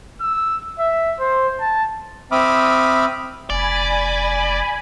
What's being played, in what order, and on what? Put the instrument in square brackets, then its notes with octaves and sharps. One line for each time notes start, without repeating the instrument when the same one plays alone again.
[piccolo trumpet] E6
E5
C5
A5
[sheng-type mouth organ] C4 E5 B5 D6 D#6 F6
[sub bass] F1 [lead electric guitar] D5 [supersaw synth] G#5 B5